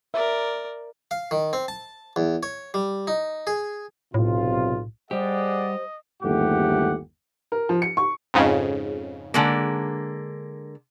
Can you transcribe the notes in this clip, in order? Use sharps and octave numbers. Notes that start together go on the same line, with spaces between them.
A#4 D5 E5
F5
D#3
C4
A5
E2
C#5
G3
D#4
G#4
B1 A2 C3 F4
G3 G4 G#4 C5 D5 D#5 F#5
G1 D#2 G#2 A3 G4 F#5
A#4
F3
C#7
C#6
F2 G#2 C#3
D3 G#3 A#3